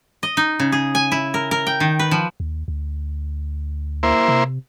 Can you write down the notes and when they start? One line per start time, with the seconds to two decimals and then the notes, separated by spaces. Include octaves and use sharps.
0.23 D#5
0.37 D#4
0.60 C#3
0.72 G#4
0.95 G#5
1.12 E4
1.34 A#4
1.51 A#4
1.67 G5
1.80 D#3
1.99 B4
2.11 F3
2.40 D#2
2.68 D2
4.03 A#3 E4 C5
4.28 C3